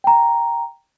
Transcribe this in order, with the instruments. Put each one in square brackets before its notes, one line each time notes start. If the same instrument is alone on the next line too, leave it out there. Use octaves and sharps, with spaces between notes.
[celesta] G5 A#5